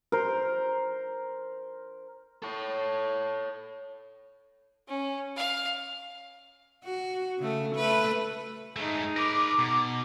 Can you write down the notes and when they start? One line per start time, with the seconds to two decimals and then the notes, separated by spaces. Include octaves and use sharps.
0.12 A#4 C5
2.42 A4 C#5
4.88 C#4
5.36 F5
6.84 F#4
7.39 C#3 A3
7.76 A3 B4
8.77 G#2 A3 D#4 G#4
9.17 A#4 B4 D6
9.59 B2 A#5